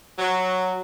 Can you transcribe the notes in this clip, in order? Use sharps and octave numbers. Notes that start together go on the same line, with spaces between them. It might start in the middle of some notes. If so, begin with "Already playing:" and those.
F#3